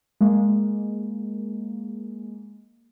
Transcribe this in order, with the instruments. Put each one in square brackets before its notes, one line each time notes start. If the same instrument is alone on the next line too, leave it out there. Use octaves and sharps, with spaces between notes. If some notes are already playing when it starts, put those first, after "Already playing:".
[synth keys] G#3 A#3